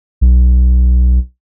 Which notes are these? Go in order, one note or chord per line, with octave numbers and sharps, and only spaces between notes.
B1